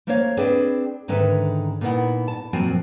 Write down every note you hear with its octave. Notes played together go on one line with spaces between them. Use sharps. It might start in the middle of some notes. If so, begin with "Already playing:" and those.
A3 A#3 C#4 C5 C#5 F5
C4 D4 G#4 B4
G#2 D3 D#3 C#4 B4 E5
A#2 A3 B3 D#4 E4 F#5
A5
F#2 A#2 F3 C4 F#4 G#5